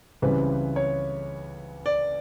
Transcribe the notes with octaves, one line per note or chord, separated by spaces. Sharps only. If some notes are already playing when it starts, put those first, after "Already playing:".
C#2 C#3 E3 G3 C4 B4
C#5
D5